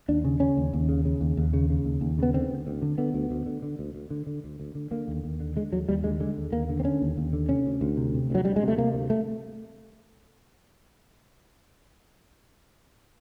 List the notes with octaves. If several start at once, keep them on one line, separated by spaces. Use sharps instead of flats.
D#2 D4
C#3
C#3 C#4
D#2
D#2
C#3
C#3
D#2
D#2
C#3
C#3
D#2
D#2
C#3 B3
D3 C4
D2
D2
D3
D3 B3
D2
D2
D3
D3
D2
D2
D3
D3
D2
D2
D3
D3 A#3
D#2
D#2
D3
D3 G#3
D#2 F#3
D#2 G3
D3 G#3
D3 G#3
D#2
D#2 A#3
D3
C4
D3 C#4
D#2
D#2
D3
C3 C#4
D2
D2
C3
C3
D2 F#3
D2 G3
G#3
C3
A3
C3 A#3
D2
A3